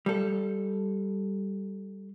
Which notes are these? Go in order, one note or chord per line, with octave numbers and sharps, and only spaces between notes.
G3 A4